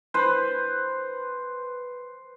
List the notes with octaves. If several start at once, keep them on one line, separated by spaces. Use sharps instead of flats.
B4 C5